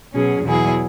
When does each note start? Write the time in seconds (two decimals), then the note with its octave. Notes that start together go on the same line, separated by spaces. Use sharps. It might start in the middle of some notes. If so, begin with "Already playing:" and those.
0.14 B2 F#3 C#4 G#4
0.44 E2 B2 F#3 E4 G#4